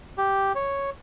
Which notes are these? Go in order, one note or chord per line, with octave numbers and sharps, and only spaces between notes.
G4
C#5